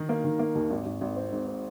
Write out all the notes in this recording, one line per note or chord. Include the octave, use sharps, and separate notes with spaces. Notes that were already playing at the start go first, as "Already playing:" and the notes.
Already playing: D#3 D#4
A#3
D#3
A#3
D#2
G#1
G#1
G#1
C4
G#2
C4